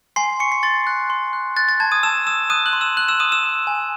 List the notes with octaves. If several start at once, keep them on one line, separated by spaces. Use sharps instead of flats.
G#5 C6 C7
C#6 C#7
C7
C6 A6
F#6
C6
F#6
F#6 A6
A6
A5 G#6
D#6 D#7
A5 E6 E7
D#6 E6 E7
D#6 F#6 D#7
F#6 F#7
C6
E6 E7
C6 F#6 F#7
E6 E7
D#6 D#7
E6 E7
E6
G#5